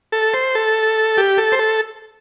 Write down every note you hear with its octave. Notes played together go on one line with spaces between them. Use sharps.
A4
C5
A4
G4
A4
C5
A4